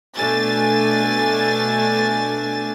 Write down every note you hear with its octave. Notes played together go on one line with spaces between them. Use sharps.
B2 A3 D4 G#5 A6